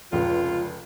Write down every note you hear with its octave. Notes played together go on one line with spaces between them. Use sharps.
F1 C#2 F4